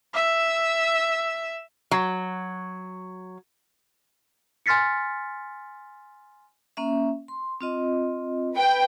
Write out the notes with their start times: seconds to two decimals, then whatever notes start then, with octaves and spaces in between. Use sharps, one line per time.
0.14 E5 E6
1.91 F#3
4.66 G#5 C6 F6 A6 B6 C#7
6.77 A#3 C#4 E5
7.28 C6
7.61 C4 F4 D#5
8.53 B4 G5